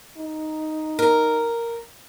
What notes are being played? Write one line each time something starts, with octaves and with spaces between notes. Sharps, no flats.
D#4
A#4